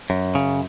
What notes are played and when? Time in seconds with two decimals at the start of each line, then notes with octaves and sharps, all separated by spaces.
0.10 F#2
0.35 C#3